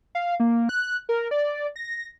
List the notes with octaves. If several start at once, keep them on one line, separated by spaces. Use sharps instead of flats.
F5
A#3
F#6
A#4
D5
A#6